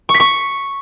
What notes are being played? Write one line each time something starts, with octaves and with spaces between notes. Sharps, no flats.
C#6
B6
C#6